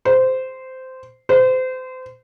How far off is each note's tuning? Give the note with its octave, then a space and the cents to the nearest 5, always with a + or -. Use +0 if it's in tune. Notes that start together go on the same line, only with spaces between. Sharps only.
C5 -15
C5 -30